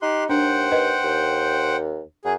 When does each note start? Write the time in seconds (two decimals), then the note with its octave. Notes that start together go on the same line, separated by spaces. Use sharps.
0.02 D#4 G4 C6 F#6
0.29 D#2 D4 C5 F#5 G5
0.72 B4 D#5
1.03 D#2
2.25 F#2 G#4